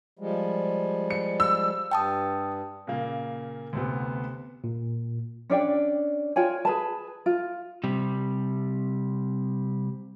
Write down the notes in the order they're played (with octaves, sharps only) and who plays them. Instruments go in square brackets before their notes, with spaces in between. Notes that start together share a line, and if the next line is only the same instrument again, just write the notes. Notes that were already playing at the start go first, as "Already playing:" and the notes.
[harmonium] F3 G3 G#3
[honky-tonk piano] C#7
E6
[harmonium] G2 [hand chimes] G5 A5 D#6
[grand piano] A#2 C#3 A#3
D2 C3 B3
[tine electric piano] A#2
[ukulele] C#4 D4 D5 G5
F4 C#5 G5 G#5
G#4 B4 A5
F4
[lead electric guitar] C3 G3